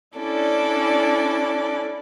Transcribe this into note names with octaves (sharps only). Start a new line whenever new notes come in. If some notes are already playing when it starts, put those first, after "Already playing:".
C#4 D4 E4 A4 D5